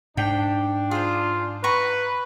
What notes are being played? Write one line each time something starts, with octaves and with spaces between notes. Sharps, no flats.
G#2 D4 G5
F4 G#4 C5
B4 A#5 C#6